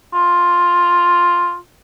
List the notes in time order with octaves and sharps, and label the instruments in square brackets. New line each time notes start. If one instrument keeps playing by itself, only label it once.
[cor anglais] F4